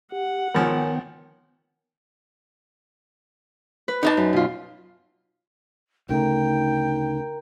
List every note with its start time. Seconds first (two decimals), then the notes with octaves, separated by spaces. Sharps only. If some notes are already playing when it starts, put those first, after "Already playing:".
0.12 G4 F#5
0.54 G#1 D#3 F3 B3 A#4 C#5 G5 G#5
3.88 B4
4.03 D#4 D#5 A5
4.17 F#2
4.33 B2 F4
6.09 D2 C#3 A3 D#4 A#4 G5 A#5